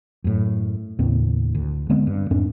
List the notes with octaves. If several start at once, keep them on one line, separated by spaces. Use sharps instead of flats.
F#2 A2
D#2 A2 C#3 C4
D2
D3 G#3 B3 C4
G2
F2 G#2 C4 D4